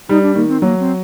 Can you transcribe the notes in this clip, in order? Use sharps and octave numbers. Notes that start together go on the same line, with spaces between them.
G3 D#4
D4
D#3 A#3
C4
F#3 A#3
C4